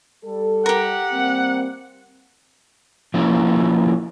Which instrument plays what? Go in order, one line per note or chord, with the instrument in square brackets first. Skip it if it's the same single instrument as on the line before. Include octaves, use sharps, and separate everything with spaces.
[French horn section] G3 A4
[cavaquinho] G4 A#4 [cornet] F#5
[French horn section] G3 A#3 C4
[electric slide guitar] F3 A#3 C#4 E4